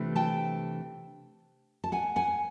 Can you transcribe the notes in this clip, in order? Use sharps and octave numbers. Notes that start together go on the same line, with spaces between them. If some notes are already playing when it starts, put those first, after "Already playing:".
Already playing: C3 E3 A3 D4 F4
G5 A5
A5
F#5 G#5
F#5 G#5